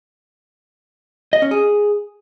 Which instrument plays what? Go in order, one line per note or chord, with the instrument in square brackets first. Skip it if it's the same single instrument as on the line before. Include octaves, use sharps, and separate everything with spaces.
[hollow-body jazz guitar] D#5
C#4
G#4